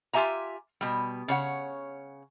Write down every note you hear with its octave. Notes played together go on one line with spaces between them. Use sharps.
F4 G4 E5 G#5 A#5
B2 G3
C#3 C#5 F#5